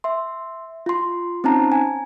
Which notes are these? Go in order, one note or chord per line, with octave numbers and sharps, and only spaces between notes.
E5 C6
F4 C6
C4 C#4 D#4 A5 A#5
G#5